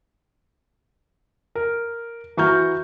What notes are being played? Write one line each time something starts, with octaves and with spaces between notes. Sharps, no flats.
A#4
E3 F#4 A#5 C#6 F6 G6